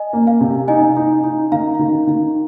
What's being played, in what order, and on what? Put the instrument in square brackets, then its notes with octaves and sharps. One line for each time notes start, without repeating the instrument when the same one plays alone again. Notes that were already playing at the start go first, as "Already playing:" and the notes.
Already playing: [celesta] D#5 G#5
[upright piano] A#3
[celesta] F5
[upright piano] C3
[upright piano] D#4 [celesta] D#5 G#5
[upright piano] D#4
D#4
[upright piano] D#3 [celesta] F5 A#5
[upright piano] D#3
D#3